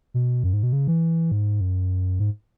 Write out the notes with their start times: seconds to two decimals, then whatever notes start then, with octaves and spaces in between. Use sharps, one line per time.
0.14 B2
0.44 F#2
0.53 G#2
0.63 B2
0.73 C#3
0.87 E3
1.32 G#2
1.61 F#2
2.19 G#2